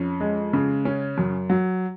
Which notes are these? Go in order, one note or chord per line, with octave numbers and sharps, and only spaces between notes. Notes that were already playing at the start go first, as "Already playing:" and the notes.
Already playing: F2 C#4
G#3
C#3
C#4
F#2
F#3